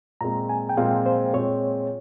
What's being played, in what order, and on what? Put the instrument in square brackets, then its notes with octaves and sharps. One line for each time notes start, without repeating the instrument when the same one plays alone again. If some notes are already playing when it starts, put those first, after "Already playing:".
[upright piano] A#2 G#3 C4 [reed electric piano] A#5
[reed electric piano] G#5
G5
[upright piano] A#2 G#3 C4 [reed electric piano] F5
[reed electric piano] C5
[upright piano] A#2 G#3 C4 [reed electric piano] C#5